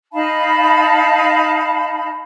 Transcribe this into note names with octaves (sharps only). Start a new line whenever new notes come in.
D#4 F5 A5 B5